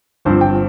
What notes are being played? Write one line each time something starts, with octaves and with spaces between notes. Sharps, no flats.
G1 G2 F3 C4 C5
G5